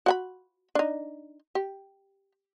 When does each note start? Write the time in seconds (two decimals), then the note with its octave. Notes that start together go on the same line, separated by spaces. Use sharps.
0.06 F#4 F#5 B5
0.75 D4 D#4
1.55 G4